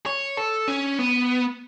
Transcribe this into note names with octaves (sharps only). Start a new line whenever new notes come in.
C#5
A4
C#4
B3